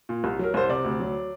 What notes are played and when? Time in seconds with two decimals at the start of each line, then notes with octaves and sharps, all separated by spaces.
0.09 A#2
0.24 C2
0.39 F#3 A#4
0.54 C2 C5
0.69 C3 D5
0.85 D2
1.00 F#3